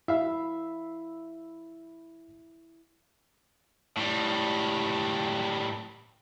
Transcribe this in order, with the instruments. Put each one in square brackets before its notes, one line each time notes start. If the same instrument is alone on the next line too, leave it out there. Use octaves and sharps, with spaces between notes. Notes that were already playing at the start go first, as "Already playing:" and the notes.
[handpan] E4 [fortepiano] E5 F5 E6
[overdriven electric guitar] A2 G3